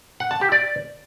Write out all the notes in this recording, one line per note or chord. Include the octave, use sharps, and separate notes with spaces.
F#5
A5
G4
D5